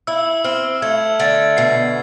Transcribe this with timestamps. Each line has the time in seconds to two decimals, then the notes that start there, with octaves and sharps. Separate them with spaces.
0.07 E4 E6
0.44 C4 F6
0.82 A3 G#6
1.19 D3 A6
1.57 B2 C7